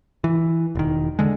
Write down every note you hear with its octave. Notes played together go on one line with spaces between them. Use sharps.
E3
E1 D#3
D3 G#3